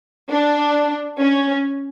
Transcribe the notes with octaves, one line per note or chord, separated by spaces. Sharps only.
D4
C#4